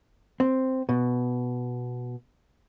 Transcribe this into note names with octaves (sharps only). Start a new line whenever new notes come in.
C4
B2